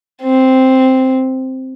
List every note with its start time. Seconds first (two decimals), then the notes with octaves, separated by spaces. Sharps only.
0.22 C4